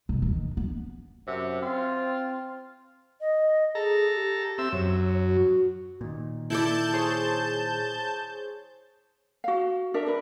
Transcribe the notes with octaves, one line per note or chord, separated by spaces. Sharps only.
B1
D#3
B3
F#2 C3
C4 F4
D#5
G#4 A4 A#5
G4
C4 E5 E6
F#2 C#5
F#4
A#2 D#3
E4 A4 D5 A5 G6
G#4 C5 C#5
F#4 F5
D4 A#4 E5
A#4 B4